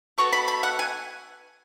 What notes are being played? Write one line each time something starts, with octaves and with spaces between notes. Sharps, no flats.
B3 F#4 A4 C#6
B5
B5
F#5
G#5